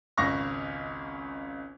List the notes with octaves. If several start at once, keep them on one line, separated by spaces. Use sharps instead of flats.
G#1 C#2 F5 C#6 A#6